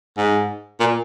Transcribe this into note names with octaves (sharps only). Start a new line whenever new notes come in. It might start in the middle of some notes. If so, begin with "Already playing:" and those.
G#2
A#2